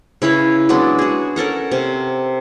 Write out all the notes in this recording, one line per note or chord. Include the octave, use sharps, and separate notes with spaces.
C#3 E4 B4 C#5
F#3 G#3 B3 D4
F#4 G#4
C#4 A4 A#4 F#5
C3